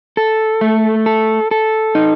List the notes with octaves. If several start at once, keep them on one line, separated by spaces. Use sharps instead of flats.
A4
A3
A4
A4
D#4